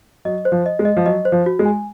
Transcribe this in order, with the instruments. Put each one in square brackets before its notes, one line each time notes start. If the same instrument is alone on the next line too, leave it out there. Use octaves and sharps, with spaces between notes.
[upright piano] F#3 [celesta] D#5
[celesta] C5
[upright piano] F3
[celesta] D#5
[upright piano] G#3
[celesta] D#5
[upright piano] F3
[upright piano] F#3 [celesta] D#5
[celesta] C5
[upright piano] F3
[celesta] F#4
[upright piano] G#3
[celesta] G#5